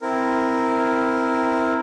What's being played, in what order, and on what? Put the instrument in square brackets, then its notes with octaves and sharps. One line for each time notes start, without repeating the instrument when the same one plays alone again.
[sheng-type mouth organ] C4 E4 A#4